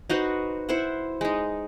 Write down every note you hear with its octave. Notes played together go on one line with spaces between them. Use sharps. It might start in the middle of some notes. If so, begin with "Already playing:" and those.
D#4 F#4 B4 C5
E4 C5 E5 F#5
G#3 D#4